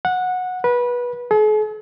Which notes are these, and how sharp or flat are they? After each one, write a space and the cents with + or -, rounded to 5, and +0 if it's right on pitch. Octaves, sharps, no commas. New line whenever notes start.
F#5 -15
B4 -20
G#4 +45